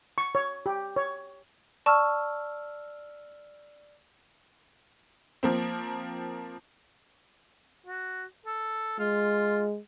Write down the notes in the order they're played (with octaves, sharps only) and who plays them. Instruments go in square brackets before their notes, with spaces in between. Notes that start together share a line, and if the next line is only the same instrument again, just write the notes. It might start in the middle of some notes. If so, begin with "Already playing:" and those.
[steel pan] C#6
C#5
G4
C#5
[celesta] D5 E6 F6 [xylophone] A5 C#6
[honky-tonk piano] F3 A#3 C4
[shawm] F#4
A4
[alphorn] G#3 [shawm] F4